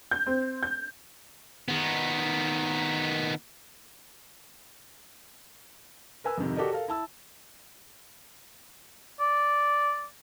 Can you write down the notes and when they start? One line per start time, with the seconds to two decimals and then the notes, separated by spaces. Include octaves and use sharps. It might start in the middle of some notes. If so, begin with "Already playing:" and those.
0.11 G6
0.26 C4
0.63 G6
1.68 D#3 B3
6.24 A#4 B4 G#5 E6
6.37 F2 G#2 C3 D#3
6.56 F#4 G4 A4 A#4 D5 D#5
6.72 A4 A#4 F5
6.88 E4 A5 E6
9.20 D5